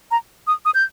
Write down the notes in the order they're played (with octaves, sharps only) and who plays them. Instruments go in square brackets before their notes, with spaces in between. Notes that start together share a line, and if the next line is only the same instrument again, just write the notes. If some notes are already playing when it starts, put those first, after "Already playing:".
[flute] A#5
D#6
D#6
G6